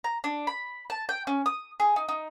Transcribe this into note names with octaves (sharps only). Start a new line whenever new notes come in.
A#5
D4
B5
A5
G5
C#4
D#6
G#4
D#4
D#4